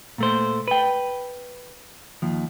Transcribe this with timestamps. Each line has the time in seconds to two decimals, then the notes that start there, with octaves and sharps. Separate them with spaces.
0.18 A#2 A3 C5
0.68 B4 G5
2.22 D#2 F3